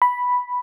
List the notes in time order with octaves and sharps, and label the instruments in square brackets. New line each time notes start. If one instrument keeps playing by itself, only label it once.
[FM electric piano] B5